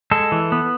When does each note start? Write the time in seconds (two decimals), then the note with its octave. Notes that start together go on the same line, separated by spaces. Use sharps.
0.11 G#3 A4
0.32 E3
0.52 B3